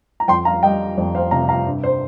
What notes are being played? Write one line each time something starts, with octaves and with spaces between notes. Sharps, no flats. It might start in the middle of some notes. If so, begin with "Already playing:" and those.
A#5
F2 G5 C6
F5 A#5
G3 D#5 G5
F2
C5 F5
C3 F5 A#5
F5 A#5
G2
C5